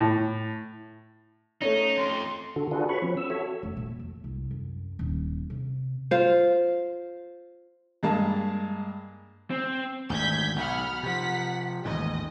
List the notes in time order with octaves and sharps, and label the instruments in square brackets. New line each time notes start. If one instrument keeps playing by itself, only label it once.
[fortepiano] A2
[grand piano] A3 C#4 [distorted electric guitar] D#4
[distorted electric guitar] F2 [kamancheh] C6
[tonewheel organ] D3 F#4 A4
D4 F4 F#4 G#4 A4 B4
B4 C#5 B5 C#6
F3 C4 C#4
E6
F#4 A4 C#5 E5
[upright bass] F1
A#2
F2
C2
F#2
D#1
C3
[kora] F4 C5
[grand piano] G2 G#3 A#3 A5
[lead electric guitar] C4
[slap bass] G#1 D2 [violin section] G6 G#6 B6
[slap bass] B1 [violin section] F#5 B5 F6
[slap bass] C3 F3 [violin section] F#5 B6
[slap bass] A1 D#2 G#2 [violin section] D#5